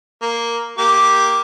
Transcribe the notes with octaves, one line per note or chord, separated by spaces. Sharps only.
A#3
A#3 G4 D6